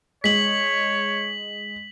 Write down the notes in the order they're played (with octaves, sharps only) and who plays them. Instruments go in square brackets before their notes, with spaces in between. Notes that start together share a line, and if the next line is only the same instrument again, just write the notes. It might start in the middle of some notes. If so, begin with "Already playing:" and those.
[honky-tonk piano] G#3 [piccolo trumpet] C#5 [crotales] B6 F#7